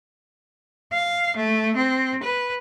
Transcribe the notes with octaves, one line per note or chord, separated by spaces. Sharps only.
F5
A3
C4
B4